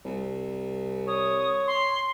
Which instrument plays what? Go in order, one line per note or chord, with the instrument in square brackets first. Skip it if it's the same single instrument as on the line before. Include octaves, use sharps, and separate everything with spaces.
[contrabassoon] C2
[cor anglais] C#5 [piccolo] D#6
[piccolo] C6